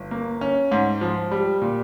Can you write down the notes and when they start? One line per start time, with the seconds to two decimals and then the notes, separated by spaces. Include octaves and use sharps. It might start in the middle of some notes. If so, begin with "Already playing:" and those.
Already playing: G1
0.11 A#3
0.41 C#4
0.72 G#2
1.01 F3
1.31 G3
1.62 A#2